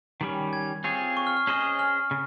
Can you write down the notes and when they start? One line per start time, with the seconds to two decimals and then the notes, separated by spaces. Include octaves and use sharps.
0.21 D#3 G3 C#4
0.53 G#6
0.84 C4 F4 G#4 C#5
1.17 C#6
1.27 F6
1.37 F6
1.47 C#4 G#4 C5 D#5
1.79 F6
2.11 C#3